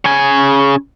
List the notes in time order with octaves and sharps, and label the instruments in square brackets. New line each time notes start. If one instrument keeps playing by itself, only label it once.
[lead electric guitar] C#3 G#5